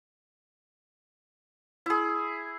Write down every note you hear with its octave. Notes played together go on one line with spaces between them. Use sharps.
E4 G#4